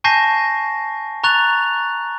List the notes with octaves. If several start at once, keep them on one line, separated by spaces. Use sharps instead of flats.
G#5 A5 C#6 G6 A#6 C7
A#5 C#6 F#6 A6 F7